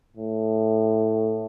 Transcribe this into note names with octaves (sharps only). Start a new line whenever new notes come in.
A2